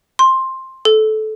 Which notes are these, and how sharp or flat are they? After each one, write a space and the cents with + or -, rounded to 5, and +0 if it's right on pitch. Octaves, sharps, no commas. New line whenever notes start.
C6 +10
A4 -20